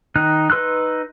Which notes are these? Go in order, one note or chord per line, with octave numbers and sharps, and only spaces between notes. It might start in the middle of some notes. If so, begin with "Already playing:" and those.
D#3 D#4 F#6
D#4 B4 C6 E6 F#6